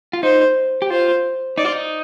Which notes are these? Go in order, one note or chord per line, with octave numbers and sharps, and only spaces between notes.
F4
D#4 C5
G4
F4 C5
D#4 D5
F4
D#4